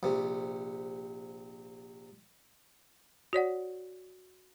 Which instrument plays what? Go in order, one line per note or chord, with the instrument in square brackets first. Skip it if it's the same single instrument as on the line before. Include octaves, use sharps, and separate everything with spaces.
[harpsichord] A#1 C3
[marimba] F#4 C#5 D5 F#5